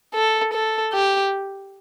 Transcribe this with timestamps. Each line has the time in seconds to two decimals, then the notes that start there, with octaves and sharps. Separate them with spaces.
0.15 A4
0.54 A4
0.93 G4